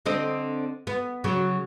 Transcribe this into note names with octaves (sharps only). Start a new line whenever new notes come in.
D3 C4 D#5
B3
C#3 F#3